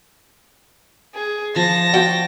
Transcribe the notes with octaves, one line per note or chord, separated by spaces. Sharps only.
G#4
F3 A5 A#6
F#4 G5